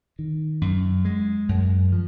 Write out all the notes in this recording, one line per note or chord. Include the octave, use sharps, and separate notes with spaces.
D#3
F#2
G#3
F#2
F3